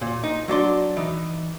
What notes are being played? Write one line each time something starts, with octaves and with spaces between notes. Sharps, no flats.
A#2
D#4
F#3 D4 D5 C6
E3 D#4